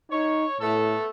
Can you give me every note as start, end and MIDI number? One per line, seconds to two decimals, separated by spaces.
0.11 0.46 63
0.11 0.57 73
0.61 0.95 45
0.61 1.07 57
0.61 1.07 59
0.61 1.07 69